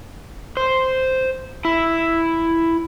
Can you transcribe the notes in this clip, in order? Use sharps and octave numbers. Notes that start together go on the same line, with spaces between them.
C5
E4